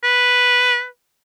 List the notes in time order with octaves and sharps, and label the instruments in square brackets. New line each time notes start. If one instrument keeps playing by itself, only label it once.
[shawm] B4